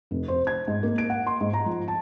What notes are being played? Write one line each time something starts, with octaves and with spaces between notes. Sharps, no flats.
F1
C5
G#6
G#2
A#3
D7
F#5
C6
G#2
A#5
F3
A5